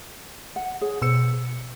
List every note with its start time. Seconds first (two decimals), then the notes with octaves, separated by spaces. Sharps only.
0.56 F#5
0.81 G#4 C#5 F#5
1.02 B2 C5 E6 C#7